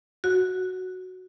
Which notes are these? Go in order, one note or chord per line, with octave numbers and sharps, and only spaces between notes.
F#4